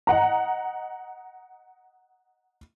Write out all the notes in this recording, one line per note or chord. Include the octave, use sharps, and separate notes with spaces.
D#5 F#5 A#5